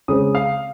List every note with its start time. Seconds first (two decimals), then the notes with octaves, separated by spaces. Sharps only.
0.08 C#3 G#3 C4 D#6
0.35 F5